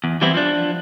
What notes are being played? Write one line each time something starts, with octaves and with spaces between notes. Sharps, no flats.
E2
E3 G3 B3 C4 E4
F3 D4